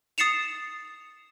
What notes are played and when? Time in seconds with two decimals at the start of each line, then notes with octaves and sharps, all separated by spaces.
0.18 D#6 A6 C7 C#7 E7 F7